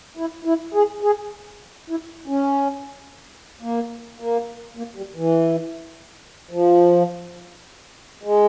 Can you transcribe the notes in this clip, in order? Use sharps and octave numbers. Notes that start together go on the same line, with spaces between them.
E4
E4
G#4
G#4
E4
C#4
A#3
A#3
A#3
G3
E3
F3
G#3